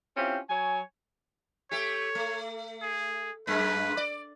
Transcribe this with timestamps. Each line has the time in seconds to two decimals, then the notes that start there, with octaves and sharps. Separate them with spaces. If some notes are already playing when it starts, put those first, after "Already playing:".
0.17 C4 C#4 E4 F4 G4
0.50 F#3 C#5 G#5
1.71 A3 G4 C#5
2.15 A3
2.82 G#4
3.47 F#2 G#3 A#3 B4
3.97 D5